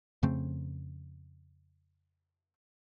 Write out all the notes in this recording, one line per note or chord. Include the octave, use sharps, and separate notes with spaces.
F2 C#3 A3 C4